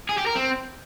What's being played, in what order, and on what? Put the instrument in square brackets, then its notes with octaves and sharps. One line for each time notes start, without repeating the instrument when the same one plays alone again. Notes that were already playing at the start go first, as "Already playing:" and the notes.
[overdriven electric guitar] G#4
G4
A#4
C4